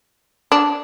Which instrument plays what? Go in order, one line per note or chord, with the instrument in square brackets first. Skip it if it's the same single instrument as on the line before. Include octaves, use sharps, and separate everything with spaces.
[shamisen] D4